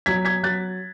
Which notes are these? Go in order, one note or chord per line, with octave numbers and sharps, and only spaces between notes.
F#3 G#6 B6
G#6 B6
F#3 F#6 A6